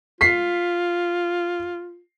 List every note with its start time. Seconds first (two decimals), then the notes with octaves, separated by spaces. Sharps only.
0.21 F4 B6 C7